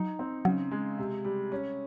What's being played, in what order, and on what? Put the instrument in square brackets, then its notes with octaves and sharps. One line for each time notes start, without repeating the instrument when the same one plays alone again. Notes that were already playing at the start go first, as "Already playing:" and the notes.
Already playing: [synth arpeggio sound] F#3 [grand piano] D#4
[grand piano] C4
[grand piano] C#3 [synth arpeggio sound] F#3
[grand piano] G#3
C3
G3
C#4